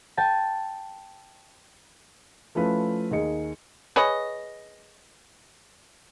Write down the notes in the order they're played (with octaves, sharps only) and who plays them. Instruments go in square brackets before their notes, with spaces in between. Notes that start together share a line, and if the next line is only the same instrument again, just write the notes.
[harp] G5 A5
[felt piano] F3 A3 C#4 E4 B4 F5
D#2 D#4 G#4 D#5 C#7
[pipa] G#4 B4 C#5 D#5